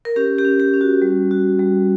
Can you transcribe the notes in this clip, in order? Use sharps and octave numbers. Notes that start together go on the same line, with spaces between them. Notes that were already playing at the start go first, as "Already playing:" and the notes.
A#4
C#4 G4
G4
C#4
G4
C#4
F#4
G3
F#4
G3